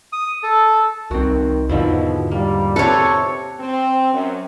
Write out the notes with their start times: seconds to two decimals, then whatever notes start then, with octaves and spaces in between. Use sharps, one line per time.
0.13 D#6
0.43 A4
1.11 C2 D#3 C4 F#4
1.69 E2 G#2 B2 D3 D#3 F3 E4
2.31 G3 A#3
2.76 C3 A4 B4 C#5 F5
3.60 C4
4.13 F#2